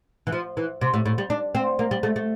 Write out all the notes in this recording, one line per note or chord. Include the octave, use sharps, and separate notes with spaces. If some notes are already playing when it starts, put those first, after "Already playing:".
E3
F3
E3
C3
A2
A2
G3
D4
C4
A#3
G3
A3
A3